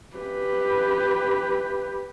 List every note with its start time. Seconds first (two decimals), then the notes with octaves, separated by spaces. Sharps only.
0.16 G4 B4